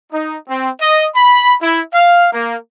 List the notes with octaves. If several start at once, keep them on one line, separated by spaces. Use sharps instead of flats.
D#4
C4
D#5
B5
E4
F5
A#3